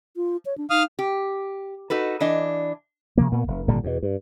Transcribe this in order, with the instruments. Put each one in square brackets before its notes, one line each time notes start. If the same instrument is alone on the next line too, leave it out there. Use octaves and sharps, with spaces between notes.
[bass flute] F4
C#5
D4
[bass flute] D#4 [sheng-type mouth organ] F5 D#6 F6
[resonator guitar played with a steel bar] G4
D#4 F#4 A4 B4
E3 D4 D#5
[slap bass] C3 F3 A#3
A#2 A#3 B3
F1
G#1 A#2 D3 G3
E2 B2
G2